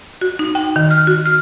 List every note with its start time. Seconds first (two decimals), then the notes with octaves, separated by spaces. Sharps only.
0.21 F#4
0.39 D#4
0.55 G5
0.76 D#3
0.91 F6
1.07 F#4
1.26 F6